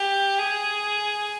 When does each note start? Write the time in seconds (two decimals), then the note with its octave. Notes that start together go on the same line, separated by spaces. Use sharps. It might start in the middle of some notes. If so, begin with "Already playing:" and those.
Already playing: G4
0.38 G#4